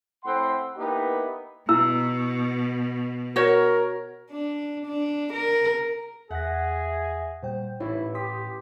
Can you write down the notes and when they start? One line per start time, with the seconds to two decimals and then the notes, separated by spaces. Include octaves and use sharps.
0.24 A2 C4 F#5 B5 C6
0.77 A#3 B3 D#4 E4 G4
1.69 B2 E4 A#5 E6
3.36 F#4 A#4 C#5
4.31 D4
4.87 D4
5.33 A#4
6.31 E2 G#4 E5 F#5 A#6
7.43 A#2 G3 C5 G5
7.80 A1 A2 D#4 E4 C#5
8.15 G4 C6 D#6 B6